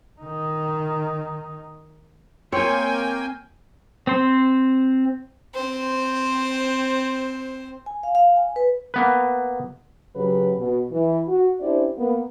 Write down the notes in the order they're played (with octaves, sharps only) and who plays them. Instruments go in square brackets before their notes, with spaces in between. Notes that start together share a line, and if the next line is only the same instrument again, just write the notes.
[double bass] D#3 D#4
[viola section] A#3 G5 G#5 [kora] C4 C#5
[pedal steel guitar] C4 C5
[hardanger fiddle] C4 C5
[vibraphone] G#5
F5
F5
G#5
B4
[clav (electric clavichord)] A#3 B3 B4
[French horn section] C#3 F#3 C#4 G4 G#4 B4
B2
E3
F#4
C#4 D4 E4 G4 C5 D5
A#3 B3